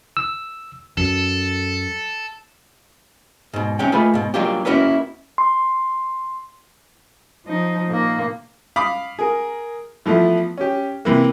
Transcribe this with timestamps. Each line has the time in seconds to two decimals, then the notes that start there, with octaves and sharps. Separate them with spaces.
0.17 E6
0.98 F#2 A4
3.53 G#2 B2
3.79 C2 C3 D#3 C#4 G5
3.92 A3 A#3 F4 G#4 B4 B5
4.14 G#2 B2
4.34 F#3 G3 A#3 D4 F4 G4
4.65 A#3 C#4 E4 F#4 A#4 B4
5.38 C6
7.45 F3 D#4
7.88 A#2 D#3 A#3
8.76 F5 B5 D6 D#6
9.19 G#4 A#4
10.06 E3 F3 A3 B3 E4
10.58 C#4 G4
11.05 C3 E3 A#3